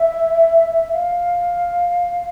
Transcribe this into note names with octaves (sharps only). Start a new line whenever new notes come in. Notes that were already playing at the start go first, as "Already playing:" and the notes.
Already playing: E5
F5